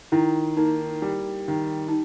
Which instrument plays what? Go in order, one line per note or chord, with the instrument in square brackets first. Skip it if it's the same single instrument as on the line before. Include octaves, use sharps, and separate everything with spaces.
[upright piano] D#3 [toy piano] E4
[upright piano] A#3 [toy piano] D#4
[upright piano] G3
D#3
[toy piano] D#4